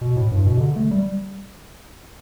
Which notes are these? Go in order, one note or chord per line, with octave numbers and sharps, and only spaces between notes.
B2
A2
G2
B2
C3
D3
A3
G3